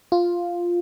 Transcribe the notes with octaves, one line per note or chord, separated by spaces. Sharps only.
F4